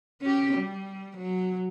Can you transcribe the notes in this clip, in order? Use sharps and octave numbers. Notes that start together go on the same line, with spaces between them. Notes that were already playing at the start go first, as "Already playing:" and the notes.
C#4 G4
G3
F#3